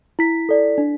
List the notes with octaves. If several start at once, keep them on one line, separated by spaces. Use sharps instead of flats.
E4 B6
A4 D5
D4